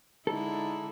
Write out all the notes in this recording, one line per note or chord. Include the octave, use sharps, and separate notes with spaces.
D3 G#3 D#4 E4 A4